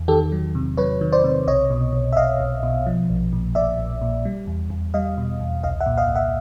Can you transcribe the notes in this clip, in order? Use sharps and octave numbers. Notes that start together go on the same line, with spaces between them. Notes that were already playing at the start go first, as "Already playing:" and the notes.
Already playing: E2
D#3 G4 A4
F#3
C3
F#3 B4 C#5
D#3
C5 D5
C3
B1 C#5 D#5
B2
B1
E5
B1 D#5 F5
B1
B2
F3
A#1
A#2
A#1 D5 E5
A#1
A#2
G3
E2
E2
G3 D#5 F5
B2
E2
C2 D#5 F5
E5 F#5
A#2
D#5 F5
C2
E5 F#5